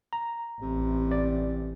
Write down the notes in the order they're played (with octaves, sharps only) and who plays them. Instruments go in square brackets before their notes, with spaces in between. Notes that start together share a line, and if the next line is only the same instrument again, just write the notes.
[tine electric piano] A#5
[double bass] A1 [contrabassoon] C3
[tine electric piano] D5